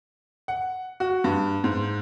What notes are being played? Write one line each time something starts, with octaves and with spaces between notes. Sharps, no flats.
F#5
F#4
G2
G#2